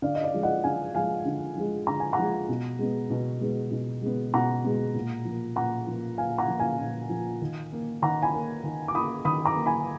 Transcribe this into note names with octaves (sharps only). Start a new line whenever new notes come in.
D3 D5 F5
D#5
D5 F5
F3 G#3
D#5 F#5
D3 F5 G#5
F3 G#3 F5 G#5
D3
F3 G#3
D3 A#5
G#5
F#5 A#5
F3 G#3
B2
G#3 B3
B2
G#3 B3
B2
G#3 B3
B2 F#5 A#5
G#3 B3
A#2
F3 A#3
A#2 F#5 A#5
F3 A#3
A#2 F5 G#5
F#5 A#5
F3 A#3
F5 G#5
A#2
F3 A#3
D#3
A#3
D#3 F#5 A#5
G#5 B5
A#3
D#3
D6
A#3 B5 D#6
D#3 B5 D#6
A#5 D6
A#3
G#5 B5